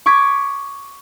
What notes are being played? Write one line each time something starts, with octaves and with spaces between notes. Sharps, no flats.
C#6 D6 G#6 B6